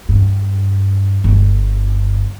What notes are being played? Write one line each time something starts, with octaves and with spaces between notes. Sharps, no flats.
G2
G1